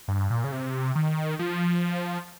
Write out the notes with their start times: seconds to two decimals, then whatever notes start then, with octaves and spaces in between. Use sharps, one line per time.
0.08 G2
0.30 A#2
0.44 C#3
0.52 C3
0.95 D#3
1.39 F3